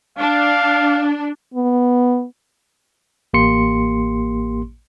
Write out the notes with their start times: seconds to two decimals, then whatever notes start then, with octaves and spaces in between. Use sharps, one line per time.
0.18 D4 F5
1.54 B3
3.33 A1 A#3 G4 C6 C#7